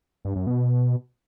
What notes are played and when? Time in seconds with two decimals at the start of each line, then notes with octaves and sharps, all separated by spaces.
0.25 G2
0.36 F#2
0.47 B2